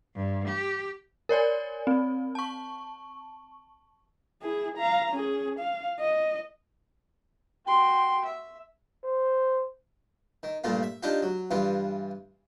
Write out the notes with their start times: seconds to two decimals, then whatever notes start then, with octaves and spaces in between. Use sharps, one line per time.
0.16 G2
0.49 G4
1.29 A#4 C#5 D5 G#5
1.87 C4
2.35 A5 C#6
4.42 E4 G#4
4.78 F5 A#5
5.12 C#4 G#4
5.59 F5
6.00 D#5
7.66 F#4 G5 C6
8.25 E5
9.04 C5
10.43 D#3
10.64 G2 A#2 A3 F4
10.83 E5
11.03 D4 D#4 F4 G4
11.22 F#3
11.51 G2 E3 F4